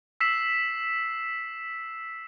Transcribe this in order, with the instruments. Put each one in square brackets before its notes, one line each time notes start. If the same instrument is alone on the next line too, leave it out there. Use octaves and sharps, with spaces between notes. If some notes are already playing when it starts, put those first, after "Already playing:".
[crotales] E6 B6 C7 E7